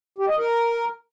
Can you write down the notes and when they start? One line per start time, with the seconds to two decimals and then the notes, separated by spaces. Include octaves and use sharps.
0.18 G4
0.28 D#5
0.38 A#4